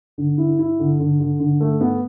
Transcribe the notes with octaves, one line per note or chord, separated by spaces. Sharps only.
D3
E4
E4
D3
D3
D3
D3
A3
B3